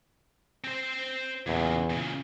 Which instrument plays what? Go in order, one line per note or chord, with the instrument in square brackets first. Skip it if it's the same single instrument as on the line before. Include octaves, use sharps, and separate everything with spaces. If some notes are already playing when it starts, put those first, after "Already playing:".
[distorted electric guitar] C4 C5
[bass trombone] E2 [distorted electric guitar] A#2 C#3
[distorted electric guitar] A#2 C#3